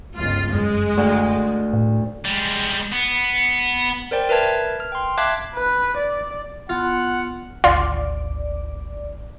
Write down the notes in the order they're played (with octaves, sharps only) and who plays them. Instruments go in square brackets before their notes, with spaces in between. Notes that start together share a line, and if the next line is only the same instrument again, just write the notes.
[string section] G1 C#2 F4
[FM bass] F#2 [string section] G#3
[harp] D2
[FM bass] A2
[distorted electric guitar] G3 G#3
B3
[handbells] A#4 C5 D5 G5
A#4 B4 E5 A5 G#6
F6
G5 C6
E5 F5 A5 D6 F#6 G#6
[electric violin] B4
D5
[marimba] B3 B5 [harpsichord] F4 [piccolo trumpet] F#5
[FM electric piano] G#1 D2 D5 [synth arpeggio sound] F4